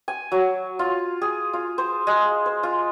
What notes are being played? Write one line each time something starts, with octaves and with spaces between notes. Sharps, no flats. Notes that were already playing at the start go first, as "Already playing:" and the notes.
G#5
F#3
F4
G#4
F4
C5
G#3
C5
F4